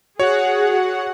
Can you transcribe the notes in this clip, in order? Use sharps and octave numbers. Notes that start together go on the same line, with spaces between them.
F#4 G#4 C#5 F#5